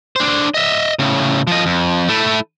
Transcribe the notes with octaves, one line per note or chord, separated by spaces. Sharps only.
D4 C5
D#5 E5
A2 C#3
F3 D#5
F2
A3 E4